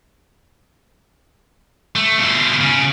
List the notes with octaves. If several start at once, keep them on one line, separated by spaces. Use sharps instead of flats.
A3
B2 F4
C#3